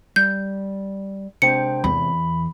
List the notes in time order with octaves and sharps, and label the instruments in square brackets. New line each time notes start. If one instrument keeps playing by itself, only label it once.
[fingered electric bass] G3 [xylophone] G6
[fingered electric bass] C3 G#3 C4 [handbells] D4 C5 G5 [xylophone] C#7
[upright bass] E2 [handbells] B5